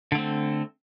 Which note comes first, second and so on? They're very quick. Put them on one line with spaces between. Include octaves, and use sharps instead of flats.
D3 A3 C4